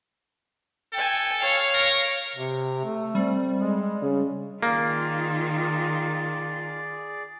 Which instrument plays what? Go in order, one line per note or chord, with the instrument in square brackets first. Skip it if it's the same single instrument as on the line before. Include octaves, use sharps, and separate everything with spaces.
[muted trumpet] A4 [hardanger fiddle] G5 G#5
[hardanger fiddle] C#5 F5
[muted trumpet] A#4
[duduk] C3
A3
[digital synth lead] G3 [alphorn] C4
[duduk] G#3
[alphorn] C#3
[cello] D#3 F4 [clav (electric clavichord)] A#3 [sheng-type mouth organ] G#4 D5 D6